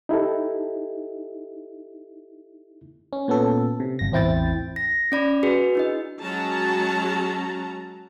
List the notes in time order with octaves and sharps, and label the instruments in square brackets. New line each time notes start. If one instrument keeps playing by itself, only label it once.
[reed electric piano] D#4 E4 G4 A4
[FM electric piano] C#4
A#2 B3 C#4 A4
C3
G1 A#6
A1 E2 C4 E4 G5 A6
[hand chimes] A#6
C#4 D5 B5
F#4 G#4 B4
D4 E4 D#5
[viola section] F#3 G#3 C#4 F#4 A5 A#5